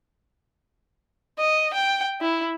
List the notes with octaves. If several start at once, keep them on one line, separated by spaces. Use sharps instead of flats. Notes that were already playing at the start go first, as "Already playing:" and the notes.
D#5
G5
E4